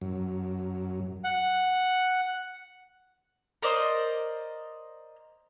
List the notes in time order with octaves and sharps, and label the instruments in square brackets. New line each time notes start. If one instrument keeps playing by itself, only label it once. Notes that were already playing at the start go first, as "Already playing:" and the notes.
[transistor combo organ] F#2
[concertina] F#5
[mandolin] A#4 C5 D5 D#5